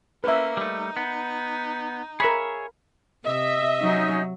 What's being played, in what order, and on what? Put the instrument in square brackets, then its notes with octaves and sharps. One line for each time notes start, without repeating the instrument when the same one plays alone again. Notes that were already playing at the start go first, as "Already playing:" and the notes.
[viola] A#3 C#4 [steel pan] B4 E5
[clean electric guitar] G3 A3 [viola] D#4
[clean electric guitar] B3
[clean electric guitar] G#4 C#5 E5 [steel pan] A#4 B5
[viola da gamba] C3 [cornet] D#5 [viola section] E5
[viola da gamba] F#3 [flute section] C#4 D#4